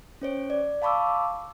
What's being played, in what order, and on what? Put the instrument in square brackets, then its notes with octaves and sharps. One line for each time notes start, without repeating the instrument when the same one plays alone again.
[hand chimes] C#4 C5 C#5
D5
F5 A5 B5 C#6 D6 E6